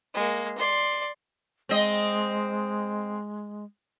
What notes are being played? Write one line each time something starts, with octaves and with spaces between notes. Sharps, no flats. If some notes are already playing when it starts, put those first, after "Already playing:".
G#3 A#3
D5 C6
G#3 C4 D#5